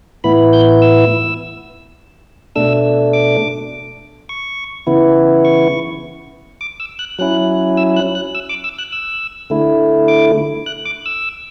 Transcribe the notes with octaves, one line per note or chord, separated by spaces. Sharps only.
A2 E3 B3 E4 B5
G6
E6
B2 A3 D4 E6
D6
C#6
C#3 E3 B3 E4
C#6
D6
E6
F#6
F#3 C#4 E4 F#6
E6
F#6
F#6
E6
D6
E6
F#6
E6
D3 A3 E4
D6
F#6
D6
E6